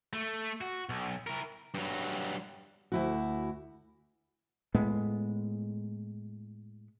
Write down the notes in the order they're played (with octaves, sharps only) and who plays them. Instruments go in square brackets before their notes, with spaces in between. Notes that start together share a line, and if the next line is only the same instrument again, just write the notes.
[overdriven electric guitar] A3
F#4
B1
E4 A#4
[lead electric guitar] G2 F#3
[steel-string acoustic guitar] D2 E4 F#4
[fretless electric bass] A2 G#3 B3